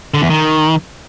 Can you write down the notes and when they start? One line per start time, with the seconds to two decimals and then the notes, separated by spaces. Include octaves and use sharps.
0.14 D3
0.22 E2
0.30 D#3